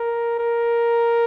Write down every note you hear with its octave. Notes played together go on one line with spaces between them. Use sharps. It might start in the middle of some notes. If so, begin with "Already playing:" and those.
Already playing: A#4
A#4